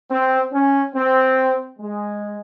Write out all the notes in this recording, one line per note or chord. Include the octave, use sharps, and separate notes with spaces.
C4
C#4
C4
G#3